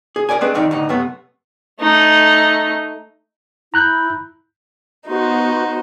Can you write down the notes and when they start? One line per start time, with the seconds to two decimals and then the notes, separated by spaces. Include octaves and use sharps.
0.16 G#4
0.29 A#4 B4 D5 G#5
0.41 G#3 A3 C4 D4 G#4 B4
0.55 F2 D#3 D#4 D5
0.71 D2 A2 D#4
0.89 F#2 C3 A3 B3
1.80 A3 D#4
3.74 E4 A#5 F#6 G6
5.06 B3 D#4 F#4 C5